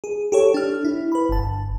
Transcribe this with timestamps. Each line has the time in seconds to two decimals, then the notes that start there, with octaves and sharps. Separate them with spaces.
0.04 G#4
0.32 G4 A4 C#5
0.54 D4 F6
0.85 E4
1.12 B4 B5
1.29 G1 A5